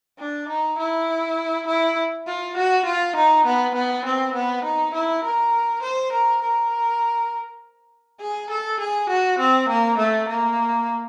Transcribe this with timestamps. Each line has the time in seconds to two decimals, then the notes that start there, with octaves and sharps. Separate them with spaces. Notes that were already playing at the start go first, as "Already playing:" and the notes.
0.19 D4
0.49 D#4
0.79 E4
1.68 E4
2.27 F4
2.57 F#4
2.86 F4
3.17 D#4
3.46 B3
3.75 B3
4.05 C4
4.35 B3
4.65 D#4
4.94 E4
5.24 A#4
5.83 C5
6.13 A#4
6.43 A#4
8.21 G#4
8.50 A4
8.80 G#4
9.10 F#4
9.39 C4
9.69 A#3
9.99 A3
10.29 A#3